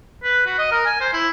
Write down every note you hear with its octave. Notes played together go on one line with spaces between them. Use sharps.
B4
F#4
D#5
A#4
G#5
C5
E4